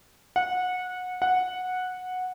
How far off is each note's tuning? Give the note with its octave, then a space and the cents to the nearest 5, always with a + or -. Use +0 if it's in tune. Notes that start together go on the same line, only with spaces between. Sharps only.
F#5 -20
F#5 -10